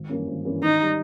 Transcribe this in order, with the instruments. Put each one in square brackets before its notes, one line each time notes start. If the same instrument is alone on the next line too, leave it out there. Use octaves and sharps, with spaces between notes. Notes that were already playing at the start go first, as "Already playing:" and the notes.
Already playing: [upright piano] G#1
G2 E3 A#3 C#4
G#1
G2 E3 A#3 C#4
[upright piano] G#1 [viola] D#4
[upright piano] G3